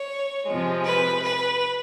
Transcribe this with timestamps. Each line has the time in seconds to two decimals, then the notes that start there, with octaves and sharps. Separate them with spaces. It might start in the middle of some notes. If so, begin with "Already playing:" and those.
Already playing: C#5
0.47 C3 F3 G#3
0.85 B4
1.23 B4